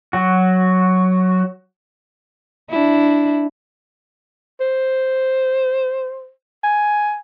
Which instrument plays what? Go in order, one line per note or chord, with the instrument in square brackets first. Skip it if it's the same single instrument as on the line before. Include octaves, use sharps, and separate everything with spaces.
[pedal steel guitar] F#3 F#4
[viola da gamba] D4 E4
[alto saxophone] C5
G#5